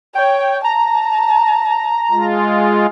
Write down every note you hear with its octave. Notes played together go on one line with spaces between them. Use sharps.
C#5 G5
A5 A#5
G#3 F4